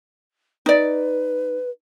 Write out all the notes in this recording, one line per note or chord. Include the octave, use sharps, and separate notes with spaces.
D#4 B4 D5